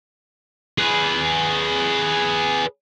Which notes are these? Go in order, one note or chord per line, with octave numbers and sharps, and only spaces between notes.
G#4 B4